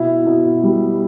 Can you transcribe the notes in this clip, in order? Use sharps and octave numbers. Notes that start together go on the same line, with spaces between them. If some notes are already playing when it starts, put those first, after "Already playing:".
Already playing: B2 E4
B2
G3